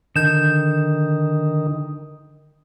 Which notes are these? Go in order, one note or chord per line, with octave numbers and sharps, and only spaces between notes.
D3 D#3 G6 E7